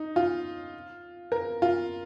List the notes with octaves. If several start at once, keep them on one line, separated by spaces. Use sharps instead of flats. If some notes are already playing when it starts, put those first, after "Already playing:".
Already playing: D#4
F4
A#4
F4